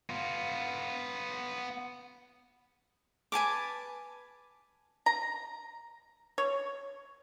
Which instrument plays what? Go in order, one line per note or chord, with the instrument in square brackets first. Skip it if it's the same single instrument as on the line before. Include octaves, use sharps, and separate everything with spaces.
[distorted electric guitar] B3 F4
[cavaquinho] B4 G#5 A5 D6
[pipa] A#5
C#5